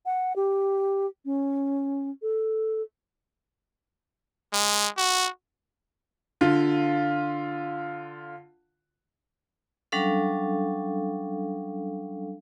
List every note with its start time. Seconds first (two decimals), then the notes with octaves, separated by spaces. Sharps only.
0.06 F#5
0.36 G4
1.25 C#4
2.22 A4
4.53 G#3
4.97 F#4
6.41 D3 F4
9.92 F#3 G3 C#4 D4 A4 F5